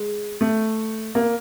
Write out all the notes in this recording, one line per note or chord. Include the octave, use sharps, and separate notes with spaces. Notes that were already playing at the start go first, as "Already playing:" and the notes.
Already playing: G#3
A3
A#3